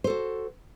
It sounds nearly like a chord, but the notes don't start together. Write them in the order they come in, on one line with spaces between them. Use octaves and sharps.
C5 A4 F#4